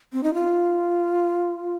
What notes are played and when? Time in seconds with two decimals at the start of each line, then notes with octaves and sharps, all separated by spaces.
0.13 C4
0.23 D#4
0.34 F4